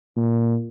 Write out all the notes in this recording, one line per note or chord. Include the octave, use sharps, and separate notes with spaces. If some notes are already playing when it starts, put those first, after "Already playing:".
A#2